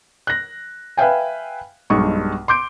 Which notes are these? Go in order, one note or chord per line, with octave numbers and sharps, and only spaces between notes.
F#6 A#6
B4 E5 F5 G5 G#5
B1 G2 G#3 C#6
C6 D6 G6 D7